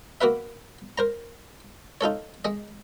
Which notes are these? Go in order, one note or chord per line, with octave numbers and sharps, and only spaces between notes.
A#3 F#4 A#4 B4 E5
A#4 C5 A#5
D#4 F4 A4 C#5
G#3 D#5